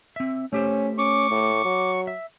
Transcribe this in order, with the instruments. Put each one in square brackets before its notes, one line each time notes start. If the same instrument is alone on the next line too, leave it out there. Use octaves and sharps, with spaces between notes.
[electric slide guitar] C4 E5
[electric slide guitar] A3 G4 C5 [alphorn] C#4
[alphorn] C#4 [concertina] C#6 [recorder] D6
[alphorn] A2
F#3
[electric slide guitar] E5